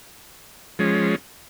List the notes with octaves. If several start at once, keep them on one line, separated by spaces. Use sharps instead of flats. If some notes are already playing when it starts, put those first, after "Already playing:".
F3 G#3 C#4